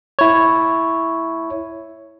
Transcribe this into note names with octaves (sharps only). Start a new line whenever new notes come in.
E4 C#5